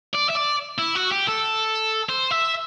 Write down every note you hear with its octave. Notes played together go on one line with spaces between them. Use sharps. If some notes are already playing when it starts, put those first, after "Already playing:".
D5
E5
D5
E4
F#4
G4
A4
C5
E5